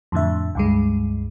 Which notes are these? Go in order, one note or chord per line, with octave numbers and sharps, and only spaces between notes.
F2 A2 D3 E5
C#2 G2 G#3